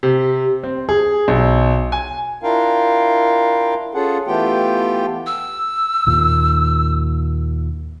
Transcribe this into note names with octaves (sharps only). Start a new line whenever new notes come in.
C3
C4
G#4
B1
G#5
D4 E4 F4 A#4 F5 G5
C#4 F4 G#4 A4 F#5
E3 A3 B3 F4 G4 G5
E6
D#2 A#2